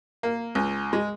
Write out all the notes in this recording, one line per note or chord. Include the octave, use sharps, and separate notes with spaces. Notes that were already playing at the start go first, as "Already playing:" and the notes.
A#3
C#2
G#3